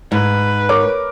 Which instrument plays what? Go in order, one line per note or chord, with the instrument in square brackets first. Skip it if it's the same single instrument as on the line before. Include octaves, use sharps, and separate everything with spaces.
[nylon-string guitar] G#2 [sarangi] B4
[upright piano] A#4 C#5 D6